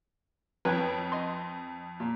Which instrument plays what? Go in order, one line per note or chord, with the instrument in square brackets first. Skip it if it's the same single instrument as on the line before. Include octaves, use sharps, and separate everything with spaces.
[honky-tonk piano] F2 [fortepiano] B4 C#5 G5
[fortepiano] D#5 C6
A#2